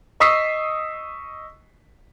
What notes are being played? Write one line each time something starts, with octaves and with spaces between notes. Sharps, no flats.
D#5 C#6 D#6 E6 B6 C7